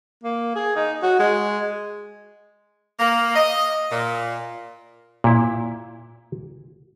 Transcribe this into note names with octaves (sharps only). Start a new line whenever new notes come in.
A#3
G#4
D#4
F#4
G#3
A#3
D#5
A#2
A#2 E4